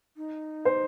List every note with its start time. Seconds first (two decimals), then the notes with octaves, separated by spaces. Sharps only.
0.17 D#4
0.65 C5